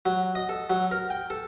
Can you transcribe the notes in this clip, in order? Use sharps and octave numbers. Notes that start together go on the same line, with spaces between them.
F#3
D#5
A4
F#3
A#4
G5
A4